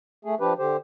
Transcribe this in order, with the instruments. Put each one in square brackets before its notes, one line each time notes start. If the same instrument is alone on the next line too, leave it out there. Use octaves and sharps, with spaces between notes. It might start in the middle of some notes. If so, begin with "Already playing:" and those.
[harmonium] A3 G#4
F3 D4 G4 B4
D3 G4 C5